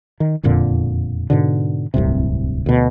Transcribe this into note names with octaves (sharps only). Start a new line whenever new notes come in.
D#3
E1 F2 A#2 D3
G#2 B2 D3
D1 C2 G2 C3
D2 B2